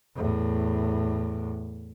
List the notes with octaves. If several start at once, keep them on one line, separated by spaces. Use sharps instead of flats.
E2 A2